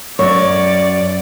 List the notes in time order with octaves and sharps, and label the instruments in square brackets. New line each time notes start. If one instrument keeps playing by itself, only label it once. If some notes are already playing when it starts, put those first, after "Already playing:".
[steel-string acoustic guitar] F#2 C#5 [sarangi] D5